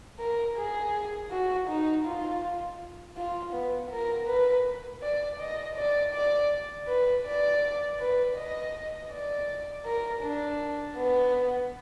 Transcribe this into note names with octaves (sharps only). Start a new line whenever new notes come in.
A#4
G#4
F#4
D#4
F4
F4
B3
A#4
B4
D5
D#5
D5
D5
B4
D5
B4
D#5
D5
A#4
D4
B3